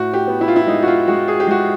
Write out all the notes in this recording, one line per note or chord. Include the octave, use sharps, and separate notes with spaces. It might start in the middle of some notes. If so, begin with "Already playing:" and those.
Already playing: A2 F#4
G4
B3
E4
F4
E4
G#3 D#4
F#4
F4
G#3 F#4
G#4
G4
G#3 F#4